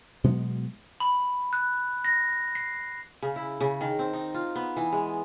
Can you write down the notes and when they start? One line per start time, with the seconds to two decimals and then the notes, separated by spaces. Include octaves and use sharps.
0.24 B2 F#3 G#3 B3
1.00 B5
1.53 F#6
2.05 A#6
2.55 C7
3.23 C#3
3.36 E4
3.61 C#3
3.81 D#3
3.99 C4
4.13 D#4
4.34 F4
4.56 B3
4.77 E3
4.93 G#3